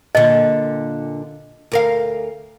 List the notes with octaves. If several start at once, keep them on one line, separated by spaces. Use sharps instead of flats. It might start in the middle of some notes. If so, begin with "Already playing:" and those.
A#2 D3 D#5
D2 A#4 F5